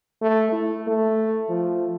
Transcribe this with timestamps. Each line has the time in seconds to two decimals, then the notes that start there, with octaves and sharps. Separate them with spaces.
0.22 A3
0.52 E4
0.87 A3
1.49 F3